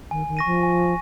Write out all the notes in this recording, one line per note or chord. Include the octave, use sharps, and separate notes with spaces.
D#3 G#5
D#3
C#6 A#6 D#7
F3
G#5